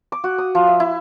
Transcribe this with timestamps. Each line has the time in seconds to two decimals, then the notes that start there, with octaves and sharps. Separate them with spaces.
0.12 D6
0.24 F#4
0.38 D#6
0.55 F3
0.67 E5
0.80 E4